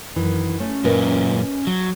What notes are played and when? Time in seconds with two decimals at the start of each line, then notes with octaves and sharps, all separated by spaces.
0.16 F#2 D#3 E3
0.60 A3 C#4
0.84 F#2 A#2 A#4 B4 D#5
1.67 F#3